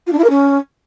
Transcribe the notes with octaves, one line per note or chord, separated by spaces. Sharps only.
F4
D4
E4
A#4
C#4